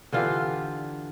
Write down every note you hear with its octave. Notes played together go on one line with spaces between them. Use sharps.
D3 E3 F4 G4